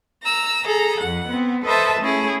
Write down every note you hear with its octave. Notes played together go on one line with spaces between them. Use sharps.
A#5 E6
G#4 A4 A#5
F2 F#5
B3 C4
A4 B4 C5 D#5 E5 A5
A3 C#4 E4 G#4